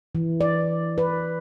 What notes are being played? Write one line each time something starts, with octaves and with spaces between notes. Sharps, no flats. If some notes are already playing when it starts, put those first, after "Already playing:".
E3
D5
B4